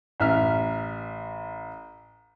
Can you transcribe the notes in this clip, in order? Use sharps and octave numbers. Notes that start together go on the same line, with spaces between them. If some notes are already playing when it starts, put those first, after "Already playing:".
A1 E5 F6